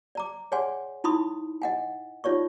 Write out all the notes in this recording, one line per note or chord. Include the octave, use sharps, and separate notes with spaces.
D5 A#5 D6
G#4 C#5 D5 F#5 G#5 C6
D#4 E4 B5 C6 D#6
D#5 F#5 G#5
D#4 F4 C#5 D5 C#6